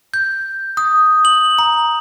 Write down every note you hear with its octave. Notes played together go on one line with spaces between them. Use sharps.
G6
D#6
F#7
A#5